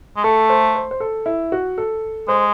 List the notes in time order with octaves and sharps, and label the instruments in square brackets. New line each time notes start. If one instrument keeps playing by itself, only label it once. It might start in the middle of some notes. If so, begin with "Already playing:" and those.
[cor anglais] G#3
[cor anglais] A3 [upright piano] A4
[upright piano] C5
C5
C5
A4
E4
F#4
A4
[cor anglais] G#3 [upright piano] C5